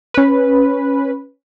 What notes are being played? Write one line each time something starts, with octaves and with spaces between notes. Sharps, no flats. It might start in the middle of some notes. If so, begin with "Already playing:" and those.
C#4 B4